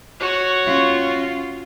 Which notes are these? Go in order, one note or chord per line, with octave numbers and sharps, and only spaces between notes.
F#4 C#5
C#4 F4